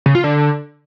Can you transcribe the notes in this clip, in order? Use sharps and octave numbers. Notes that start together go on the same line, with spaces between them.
C#3
F4
D3